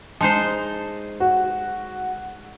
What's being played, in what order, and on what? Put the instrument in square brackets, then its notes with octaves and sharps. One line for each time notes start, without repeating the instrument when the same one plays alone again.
[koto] G#3 D#4 C5 [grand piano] A5
[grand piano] F#4